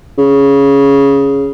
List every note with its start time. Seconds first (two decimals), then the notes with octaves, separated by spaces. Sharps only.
0.18 C#3